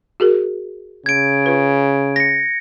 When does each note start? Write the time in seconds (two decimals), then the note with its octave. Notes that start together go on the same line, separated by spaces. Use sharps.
0.20 F#4 G#4 A#4
1.06 C#3 G#6 D7
1.46 F4 B4
2.16 A#6 C#7